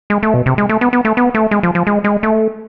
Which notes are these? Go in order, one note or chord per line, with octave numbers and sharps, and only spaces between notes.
G#3
A3
B2
C3
G#3
A3
B3
B3
A3
B3
A3
G#3
F3
F3
G#3
G#3
A3